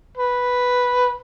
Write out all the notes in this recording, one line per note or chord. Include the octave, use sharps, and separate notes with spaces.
B4